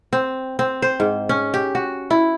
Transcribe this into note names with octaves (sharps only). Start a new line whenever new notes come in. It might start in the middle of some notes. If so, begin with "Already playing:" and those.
C4
C4
C5
G#2
C#4
G4
F#4
E4